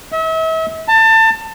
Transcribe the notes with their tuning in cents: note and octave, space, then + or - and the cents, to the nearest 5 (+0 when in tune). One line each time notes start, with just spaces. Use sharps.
E5 -40
A5 +25